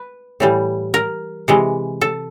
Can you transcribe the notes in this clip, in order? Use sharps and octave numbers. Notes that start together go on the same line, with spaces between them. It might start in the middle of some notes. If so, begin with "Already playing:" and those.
Already playing: B4
A2 E3 G3
A#4
C3 E3 G#3
A4